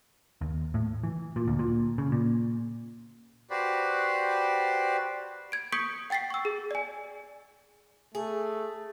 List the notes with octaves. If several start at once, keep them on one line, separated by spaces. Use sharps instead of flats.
D#2
A2
E3
A#2
D2
A#2
C#3
A#2
F#4 G4 B4 C5 D5
G#6 D7
C#6 D#6 G6 B6 C#7 D7
F#5 G5 A6 B6 C7
C#6 E6
G#4
D5 G#5
A3 G#4